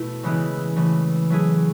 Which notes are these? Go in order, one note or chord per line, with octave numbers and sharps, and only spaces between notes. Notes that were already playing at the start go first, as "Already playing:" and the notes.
Already playing: B2 A3 E4
C#3 E3 G#3 B3 E4
C#3 E3 A3
F#3 A3 E4 G#4